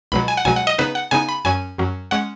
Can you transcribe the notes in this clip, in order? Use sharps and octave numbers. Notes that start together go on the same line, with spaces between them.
C#2 B2 F#3 B5
G#5
F#5
C#2 B2 F#3 G#5
F#5
D#5
C#3 B3 D#4 B4
F#5
C#3 B3 D#4 G#5
B5
F#2 F#3 C#4 G#5
F#2 F#3 C#4
G#3 C#4 F#5